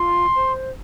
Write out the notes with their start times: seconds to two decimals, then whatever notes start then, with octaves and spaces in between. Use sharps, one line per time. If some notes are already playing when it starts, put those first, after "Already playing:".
Already playing: F4 C6
0.35 C5